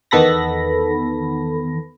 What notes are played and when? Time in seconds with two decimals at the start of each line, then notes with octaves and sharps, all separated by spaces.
0.11 E2 D#3 B3 A4 B5 A#6